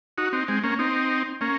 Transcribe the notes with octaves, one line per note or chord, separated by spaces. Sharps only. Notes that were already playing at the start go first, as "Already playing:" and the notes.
D#4 F#4
C4 D#4
G#3 C4
A#3 C#4
C4 D#4
A#3 C#4